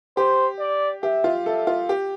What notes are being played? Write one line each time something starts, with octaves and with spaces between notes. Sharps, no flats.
G4 C5
D5
G4 E5
F4
A4 E5
F4
G4